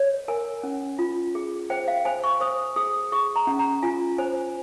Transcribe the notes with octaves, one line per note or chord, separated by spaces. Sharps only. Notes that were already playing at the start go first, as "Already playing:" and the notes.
Already playing: C#5
A#4 G#5
C#4
F4
G#4
C5 G5
F5
C5 G#5
C#6
C5 D#6
G#4 D#6
G#4 C#6
A#5
C#4
A#5
F4 G#5
C5 G#5